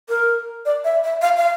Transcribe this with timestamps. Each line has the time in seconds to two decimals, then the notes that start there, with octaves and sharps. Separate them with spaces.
0.09 A#4
0.66 D5
0.84 E5
1.04 E5
1.22 F5
1.37 F5